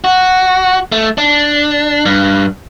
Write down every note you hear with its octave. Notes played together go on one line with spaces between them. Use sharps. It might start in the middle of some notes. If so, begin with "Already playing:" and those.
F#4
A3
D4
G2